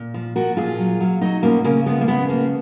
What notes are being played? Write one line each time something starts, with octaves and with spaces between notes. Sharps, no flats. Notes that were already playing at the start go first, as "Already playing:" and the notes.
Already playing: A#2
F3
F3 F#4 A#4
A#2 F4 G#4
F#3
F#3
F#3 D#4 F#4
B2 A#3 C#4
C#3 A#3 C#4
F3 G#3 B3
A#3
C#3 G#3 B3
F3 A#3